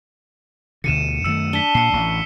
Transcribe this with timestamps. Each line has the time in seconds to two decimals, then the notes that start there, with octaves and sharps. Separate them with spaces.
0.84 D2 B2 D3 C#7 D#7 E7
1.24 F#2 D#3 A3 E6 C#7 E7
1.53 D4 B6 C#7 G7
1.75 A#2 C7 C#7
1.93 A1